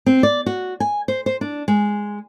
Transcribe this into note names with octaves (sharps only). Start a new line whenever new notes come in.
C4
D5
F#4
G#5
C5
C5
D4
G#3